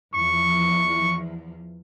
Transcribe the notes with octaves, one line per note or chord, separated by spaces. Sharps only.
E2 F3 C#6